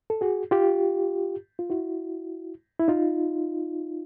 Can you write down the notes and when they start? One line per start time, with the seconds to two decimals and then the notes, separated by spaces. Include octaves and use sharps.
0.10 A4
0.21 F#4 G#4
0.51 F4 G4
1.59 F4
1.70 E4 F#4
2.80 E4
2.88 D#4 F4